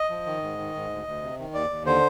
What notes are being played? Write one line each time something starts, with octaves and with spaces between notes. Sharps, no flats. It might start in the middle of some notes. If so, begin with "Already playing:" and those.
Already playing: D#5
F3
D#3
G#2
D#3
G#2
D2
D2
C3
D#3
D#2 D5
D#2
D3 C5